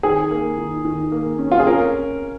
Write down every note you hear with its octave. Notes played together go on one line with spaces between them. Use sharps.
D#3 G#4
A#3
D#3
D#3
A#3
C#4
F4
G#4
C#4 A#4